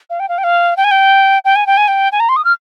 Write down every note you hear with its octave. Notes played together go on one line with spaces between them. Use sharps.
F5
G5
F5
G5
F5
G5
G#5
G5
G5
G#5
G5
G#5
G5
G#5
A#5
C6
D#6
F6